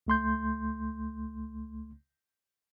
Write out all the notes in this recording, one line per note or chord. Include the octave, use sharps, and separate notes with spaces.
C#2 A3 C6 G6